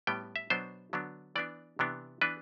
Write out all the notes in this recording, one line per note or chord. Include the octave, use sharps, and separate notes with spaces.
A2 G3 B3 G5
E5
B2 F#3 B3 D4 C5
D3 F#3 B3 D4
E3 B3 D4 D5
C3 E3 B3 D4
E3 B3 D4 B4